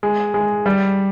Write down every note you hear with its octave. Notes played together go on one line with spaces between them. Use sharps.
G#3
G#3
G3